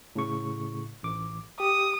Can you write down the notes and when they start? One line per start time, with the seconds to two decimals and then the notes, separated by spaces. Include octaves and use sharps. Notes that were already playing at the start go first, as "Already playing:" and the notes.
0.15 A2 C#3 C#6
1.03 A1 D6
1.60 G4 D#6